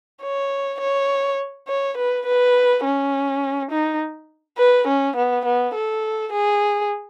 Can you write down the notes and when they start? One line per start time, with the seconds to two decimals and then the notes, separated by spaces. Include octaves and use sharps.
0.22 C#5
0.80 C#5
1.68 C#5
1.97 B4
2.26 B4
2.84 C#4
3.71 D#4
4.58 B4
4.87 C#4
5.16 B3
5.45 B3
5.74 A4
6.32 G#4